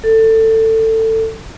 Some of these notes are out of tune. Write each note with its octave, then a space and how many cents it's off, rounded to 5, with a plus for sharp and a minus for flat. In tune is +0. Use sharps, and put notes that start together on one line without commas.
A4 +20